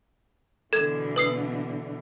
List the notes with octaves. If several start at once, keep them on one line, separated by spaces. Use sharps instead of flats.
B2 D3 E3 A4 G#6
B4 D#6 C7